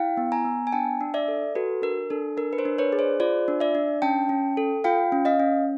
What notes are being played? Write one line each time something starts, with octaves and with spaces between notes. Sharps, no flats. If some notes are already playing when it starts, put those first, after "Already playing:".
Already playing: E4 F5 G5
B3
G#5 A#5
B3
G#5
D4 G5 A5
D4
D5 E5
A4
F#4 A4 B4
D4 A#4
D4 A4
D4 A#4
B4
A#4 C5
D4
B4 C#5
G#4
C5 D5
F4 C5 D5
D4
D5 E5
D4
C#4 G5 A5
C#4
A4
F4 F5 G5
C#4
D#5 F5
C#4